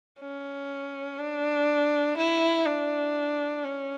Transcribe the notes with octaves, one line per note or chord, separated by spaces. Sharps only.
C#4
D4
E4
D4
C#4